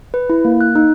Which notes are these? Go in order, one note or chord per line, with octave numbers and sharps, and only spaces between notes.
B4
E4
A#3
F#6
D#4